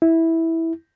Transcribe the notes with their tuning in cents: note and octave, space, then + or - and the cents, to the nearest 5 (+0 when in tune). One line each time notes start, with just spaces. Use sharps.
E4 -10